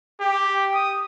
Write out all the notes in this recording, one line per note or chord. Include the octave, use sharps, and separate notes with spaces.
G4
D#6